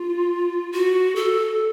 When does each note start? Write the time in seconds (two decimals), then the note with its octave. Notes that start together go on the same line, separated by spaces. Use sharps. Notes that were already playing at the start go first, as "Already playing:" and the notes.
Already playing: F4
0.73 F#4
1.16 A4